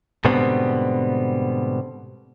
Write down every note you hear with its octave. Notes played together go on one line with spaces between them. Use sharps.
G#2 B2 D3 G3 B3 C4